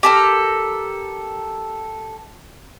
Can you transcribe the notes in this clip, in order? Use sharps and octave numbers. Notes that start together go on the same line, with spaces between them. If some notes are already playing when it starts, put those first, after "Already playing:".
G4 A4 A#4